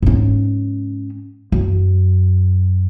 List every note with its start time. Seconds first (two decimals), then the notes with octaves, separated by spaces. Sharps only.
0.03 G#2 C#4
1.52 F#2